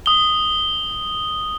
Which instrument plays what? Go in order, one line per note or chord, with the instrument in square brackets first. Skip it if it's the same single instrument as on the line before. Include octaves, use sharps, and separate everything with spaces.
[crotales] D#6 G7